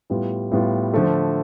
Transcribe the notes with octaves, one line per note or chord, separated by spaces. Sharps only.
A2 G3 B3 F4
A2 G3 B3 F4
D3 F3 A3